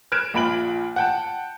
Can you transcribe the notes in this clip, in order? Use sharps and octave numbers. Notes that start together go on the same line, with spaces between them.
F6 F#6 G#6 D7 E7
A#1 A#2 B5 D7 F#7
F#5 G5 A5